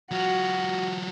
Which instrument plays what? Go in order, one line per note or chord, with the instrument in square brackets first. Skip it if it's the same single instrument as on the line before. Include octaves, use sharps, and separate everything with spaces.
[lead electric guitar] F#3 F4 [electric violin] F#4